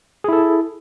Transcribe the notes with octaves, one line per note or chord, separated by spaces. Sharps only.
E4 G#4 A4